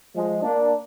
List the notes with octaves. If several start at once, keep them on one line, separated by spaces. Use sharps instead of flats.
F3 G#3
A#3 D4